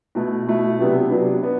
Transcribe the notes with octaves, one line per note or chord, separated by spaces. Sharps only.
B2 A3 E4
B2 A3 E4
C3 F#3 B3 D4
C3 F#3 B3 D4
B3 D4